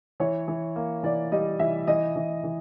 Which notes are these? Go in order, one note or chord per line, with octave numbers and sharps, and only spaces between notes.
E3 C#5
E3
A#3
E3 D5
G3 D#5
E3 E5
E3 D#5
E3
E3